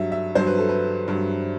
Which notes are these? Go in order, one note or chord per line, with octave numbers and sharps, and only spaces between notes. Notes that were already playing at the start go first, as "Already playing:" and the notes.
Already playing: G2 F#3 E5
E5
G2 F#3 C5
B4
A4
B4
G2 F#3